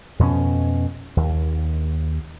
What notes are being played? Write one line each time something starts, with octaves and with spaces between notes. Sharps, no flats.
F2 B2 B3 C#4
D#2